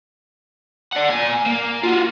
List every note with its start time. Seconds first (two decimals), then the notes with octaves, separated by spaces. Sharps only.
0.93 D5 F#5
1.10 A#2 G#5
1.46 A#3
1.83 F4 F#4